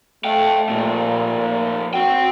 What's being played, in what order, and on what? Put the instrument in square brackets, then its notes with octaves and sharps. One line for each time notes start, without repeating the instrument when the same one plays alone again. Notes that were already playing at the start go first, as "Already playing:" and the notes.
[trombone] A3 [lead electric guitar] F5 G5
[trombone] A#2 [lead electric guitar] F3 A3
[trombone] A#3
[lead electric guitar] C4 G5 [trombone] F#4